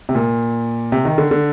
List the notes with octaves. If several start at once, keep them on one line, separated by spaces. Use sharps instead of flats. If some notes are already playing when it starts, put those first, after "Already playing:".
C3
A#2
C3
D#3
D3
D3